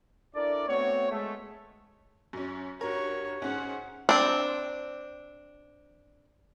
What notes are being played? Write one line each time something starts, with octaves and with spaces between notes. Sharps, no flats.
D4 E4 A4 A#4 D5
A3 B3 C4 F#4 C#5
G#3 A3
F#2 C#4
G2 F#4 A#4 C#5
G#2 C#4 F#5
C4 D4